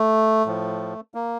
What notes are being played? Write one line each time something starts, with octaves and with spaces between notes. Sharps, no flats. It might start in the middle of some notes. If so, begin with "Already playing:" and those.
Already playing: A3
A2 F3
A#3